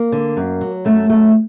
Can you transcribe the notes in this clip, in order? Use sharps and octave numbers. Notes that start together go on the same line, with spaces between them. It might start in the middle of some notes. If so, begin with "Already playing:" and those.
Already playing: A#3
D3
F#2
F#3
F#2 A3
F#2 A3